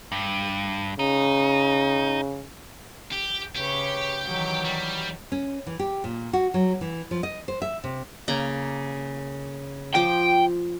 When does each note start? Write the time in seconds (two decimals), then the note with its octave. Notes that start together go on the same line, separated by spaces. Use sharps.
0.12 G2
0.99 C#3 D#4
3.12 G4
3.56 C#3 G4 B4 C#5
4.25 D#3 E3 F#3
4.65 G3
5.32 C#4
5.67 E3
5.79 G4
6.04 A#2
6.33 F#4
6.54 F#3
6.81 E3
7.11 F3
7.23 D#5
7.48 C5
7.62 E5
7.84 C3
8.28 C#3 A#3 A#5
9.95 F3 C5 G5 D6